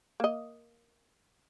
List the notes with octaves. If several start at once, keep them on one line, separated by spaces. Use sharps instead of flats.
A#3 D#5